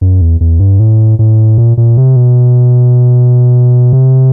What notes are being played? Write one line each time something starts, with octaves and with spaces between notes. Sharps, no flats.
F#2
E2
E2
G2
A2
A2
A#2
A#2
C3
B2
C3